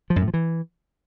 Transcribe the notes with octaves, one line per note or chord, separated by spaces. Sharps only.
F3
F#2
A2
F3
E3